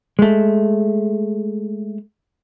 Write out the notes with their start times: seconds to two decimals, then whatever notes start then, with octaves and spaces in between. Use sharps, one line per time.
0.19 G#3 A3